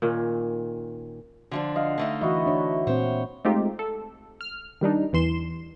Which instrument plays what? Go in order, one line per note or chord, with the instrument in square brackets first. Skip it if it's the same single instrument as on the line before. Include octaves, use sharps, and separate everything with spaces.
[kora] A#2 D#3 C#4
[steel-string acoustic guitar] D3 F3 D4
[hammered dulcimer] D#5 F5 F#5
[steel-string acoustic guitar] D3 A3 D#4
[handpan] E3 D#5 [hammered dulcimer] F#4 B4 E5
[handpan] D4 C#5
[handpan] A#2 C4 [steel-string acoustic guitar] C5 C#5
[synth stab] G#3 A3 C4 D#4 F4 G4
A4
F6
D#3 G3 D4 D#4
E2 E3 C6 E7